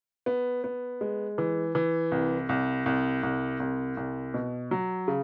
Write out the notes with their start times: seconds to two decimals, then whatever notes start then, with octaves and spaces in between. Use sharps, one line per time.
0.26 B3
0.64 B3
1.01 G#3
1.38 E3
1.75 E3
2.12 C2
2.49 C2
2.86 C2
3.23 C2
3.60 C2
3.97 C2
4.34 B2
4.71 F#3
5.08 C#3